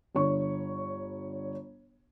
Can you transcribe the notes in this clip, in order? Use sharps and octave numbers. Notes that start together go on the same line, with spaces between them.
G1 D3 C#5 C#6